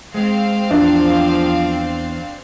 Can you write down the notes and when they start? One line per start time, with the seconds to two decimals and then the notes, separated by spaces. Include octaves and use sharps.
0.14 G#3 C4 F5
0.71 E2 F3 D4